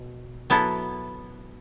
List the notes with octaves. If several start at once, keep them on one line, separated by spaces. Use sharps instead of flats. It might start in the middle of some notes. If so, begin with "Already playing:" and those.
Already playing: B2
F#3 B3 E4 A4